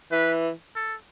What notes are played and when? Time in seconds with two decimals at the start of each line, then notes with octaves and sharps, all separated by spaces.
0.12 E3 B4
0.76 A4